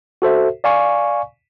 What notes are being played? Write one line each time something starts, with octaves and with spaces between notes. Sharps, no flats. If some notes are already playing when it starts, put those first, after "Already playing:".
F#4 A4 C5 E5
D5 F5 G#5 C#6